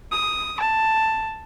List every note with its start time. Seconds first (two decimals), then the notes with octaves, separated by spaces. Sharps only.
0.11 D#6
0.60 A5